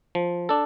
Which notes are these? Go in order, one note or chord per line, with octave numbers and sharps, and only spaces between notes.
F3
D4 A4